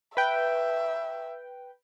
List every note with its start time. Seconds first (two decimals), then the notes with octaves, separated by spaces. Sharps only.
0.17 B4 E5 G5